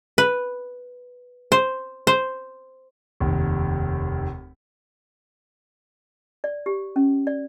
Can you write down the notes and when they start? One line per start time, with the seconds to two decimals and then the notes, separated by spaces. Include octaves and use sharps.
0.18 B4
1.52 C5
2.07 C5
3.20 F1 D#2
6.44 D5
6.66 G4
6.96 C#4
7.27 D5